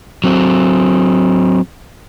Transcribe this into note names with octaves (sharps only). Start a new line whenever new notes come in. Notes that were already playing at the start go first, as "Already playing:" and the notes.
F#3 C4